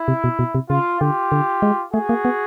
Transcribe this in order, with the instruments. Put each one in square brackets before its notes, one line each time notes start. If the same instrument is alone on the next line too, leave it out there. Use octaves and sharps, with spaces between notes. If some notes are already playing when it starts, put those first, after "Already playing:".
Already playing: [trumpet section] E4
[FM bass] C3
B2
B2
C3
[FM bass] C#3 [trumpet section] F4
[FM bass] D3 [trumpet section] F4 G4
[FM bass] D3
G#3
[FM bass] A3 [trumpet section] F#4 G#4
[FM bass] A#3
B3